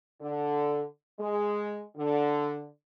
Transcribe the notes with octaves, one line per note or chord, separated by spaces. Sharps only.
D3
G#3
D3